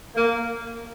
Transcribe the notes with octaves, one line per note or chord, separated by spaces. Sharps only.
A#3